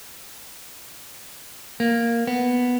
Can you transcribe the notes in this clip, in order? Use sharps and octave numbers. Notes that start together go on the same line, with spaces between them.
A#3
B3